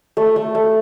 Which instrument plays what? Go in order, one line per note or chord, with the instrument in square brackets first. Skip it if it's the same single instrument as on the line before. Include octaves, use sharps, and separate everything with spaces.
[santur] A3
A3
A3